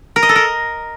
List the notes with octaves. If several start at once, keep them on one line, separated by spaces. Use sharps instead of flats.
A#4
D#5
A4
A#4